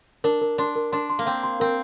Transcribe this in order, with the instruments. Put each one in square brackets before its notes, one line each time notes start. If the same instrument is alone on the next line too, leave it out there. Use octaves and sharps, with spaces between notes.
[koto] D4 [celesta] A#4
[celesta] A#4
[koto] D4 [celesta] C6
[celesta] A#4
[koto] D4 [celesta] C6
[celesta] C6
[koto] A#3
[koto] C4 [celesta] F5
[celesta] C6
[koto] C4 [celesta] A#4